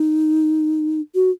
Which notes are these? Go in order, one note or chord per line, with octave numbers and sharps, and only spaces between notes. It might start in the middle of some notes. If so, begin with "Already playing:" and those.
Already playing: D#4
F#4